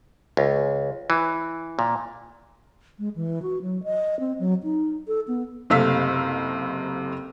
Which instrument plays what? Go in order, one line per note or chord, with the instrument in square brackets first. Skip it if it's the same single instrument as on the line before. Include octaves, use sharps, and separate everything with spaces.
[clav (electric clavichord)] C#2
E3
A#2
[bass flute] G#3
E3
F#4
F#3
D#5
C4
F#3
D#4
A4
B3
[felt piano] F#1 C3 A3 F5 E6 B6